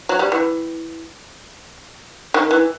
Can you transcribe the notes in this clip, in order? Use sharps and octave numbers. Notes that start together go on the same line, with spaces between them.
F#3
G3
E3
D#3
E3